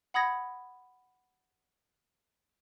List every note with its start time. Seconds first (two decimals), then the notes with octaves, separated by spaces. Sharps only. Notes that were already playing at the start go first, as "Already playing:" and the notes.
0.14 F#5 B5 D#6 G#6 A#6